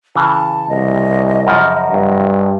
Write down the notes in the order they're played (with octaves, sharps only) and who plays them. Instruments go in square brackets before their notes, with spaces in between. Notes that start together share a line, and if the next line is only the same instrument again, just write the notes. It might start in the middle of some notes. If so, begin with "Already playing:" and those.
[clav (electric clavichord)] C#3 E3 [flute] A5
[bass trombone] C2 [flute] D#5
[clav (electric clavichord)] F#2 C#3 F3
[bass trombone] G2